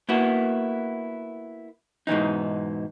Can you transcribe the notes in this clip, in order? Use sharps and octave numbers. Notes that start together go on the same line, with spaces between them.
A#3 B3 E4 F#4
G#2 B2 E3 D#4